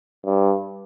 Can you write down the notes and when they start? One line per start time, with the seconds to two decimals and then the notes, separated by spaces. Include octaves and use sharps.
0.25 G2